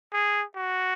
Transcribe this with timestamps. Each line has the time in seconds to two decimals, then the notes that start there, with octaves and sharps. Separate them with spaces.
0.13 G#4
0.56 F#4